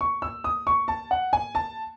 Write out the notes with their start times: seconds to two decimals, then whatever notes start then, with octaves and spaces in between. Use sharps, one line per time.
0.01 C#6
0.22 E6
0.44 D#6
0.67 C#6
0.88 A5
1.11 F#5
1.33 G#5
1.55 A5